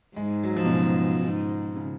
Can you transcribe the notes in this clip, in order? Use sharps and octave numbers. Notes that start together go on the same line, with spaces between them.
G#2 G#3
F#3
F3
B2
C#3
G#2
C#3